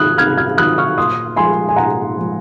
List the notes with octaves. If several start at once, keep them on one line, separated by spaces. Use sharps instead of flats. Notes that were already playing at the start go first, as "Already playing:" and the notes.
Already playing: C3 D#3 F#3 D#6 F6 F#6 G#6
C3 F6 G#6
F6 G#6
D#3 F#3 D#6 F#6
C#6 F6
A#2 C6 D#6
F3 G#3 G#5 C6
G#5
A#2 F#5 A#5
F3
G#3